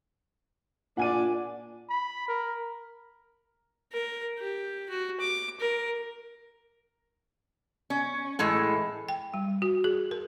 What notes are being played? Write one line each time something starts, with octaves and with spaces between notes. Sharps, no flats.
A#2 D4 D5 F#5 G#5 D#7
B5
A#4
A#4
G4
F#4
D6
A#4
C#4
A2 E3 G#3 A4
G5
G3
F#4
G#4
A#4